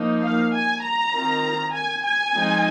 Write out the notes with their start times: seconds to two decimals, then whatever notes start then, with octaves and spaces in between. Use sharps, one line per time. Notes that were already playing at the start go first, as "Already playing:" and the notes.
Already playing: F3 A#3 D#4
0.23 F5
0.54 G#5
0.83 A#5
1.13 D#3 C4 F4
1.74 G#5
2.05 G#5
2.34 F3 G#3 C4 D#4